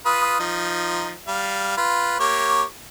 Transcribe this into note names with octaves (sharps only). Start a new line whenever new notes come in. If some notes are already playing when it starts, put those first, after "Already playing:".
F4 B4 D#6
F3 D#4
G3 F5
F4 B4
A#3 G4 C#5